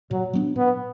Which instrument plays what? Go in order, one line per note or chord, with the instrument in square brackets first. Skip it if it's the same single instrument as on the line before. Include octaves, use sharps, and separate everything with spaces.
[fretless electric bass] A#2 [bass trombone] F#3
[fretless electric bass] F#3 B3 D4
[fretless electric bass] A#2 [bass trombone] B3